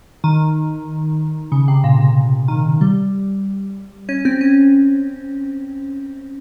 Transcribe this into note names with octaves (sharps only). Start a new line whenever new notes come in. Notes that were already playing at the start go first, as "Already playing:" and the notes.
D#3
C#3
C3
A#2
A#2
D#3
G3
C#4
C4
C#4